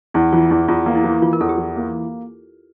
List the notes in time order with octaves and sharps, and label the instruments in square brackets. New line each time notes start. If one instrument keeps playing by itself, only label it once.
[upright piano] E2 [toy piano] E4
[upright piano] E3 [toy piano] F4
[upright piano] E2 [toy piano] E4
[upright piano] E2 [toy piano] F4
[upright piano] A#3
[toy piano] E4
[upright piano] E3
[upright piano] E3 [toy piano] F4
[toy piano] A#4
[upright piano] E2 [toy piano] A4
[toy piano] G4
[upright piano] E3
A#3